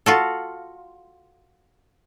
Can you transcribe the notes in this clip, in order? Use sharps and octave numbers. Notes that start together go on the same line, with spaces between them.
F4 F#4 A4